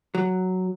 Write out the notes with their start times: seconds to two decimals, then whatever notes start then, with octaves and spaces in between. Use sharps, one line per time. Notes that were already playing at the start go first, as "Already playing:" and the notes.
0.15 F#3